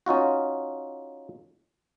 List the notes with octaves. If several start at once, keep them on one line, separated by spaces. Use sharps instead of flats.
C#4 D#4 F4 F#4